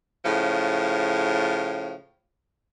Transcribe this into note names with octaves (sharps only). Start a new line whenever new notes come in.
A2 C#3 F3